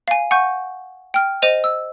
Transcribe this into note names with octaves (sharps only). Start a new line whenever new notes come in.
F5 G#5
F#5 G#5 C#6 G6
G5 F6
C5 D#5 D#7 F7
E6